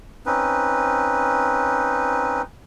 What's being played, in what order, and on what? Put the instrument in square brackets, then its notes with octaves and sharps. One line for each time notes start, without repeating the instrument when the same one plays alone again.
[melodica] C4 C#4 D#4 B4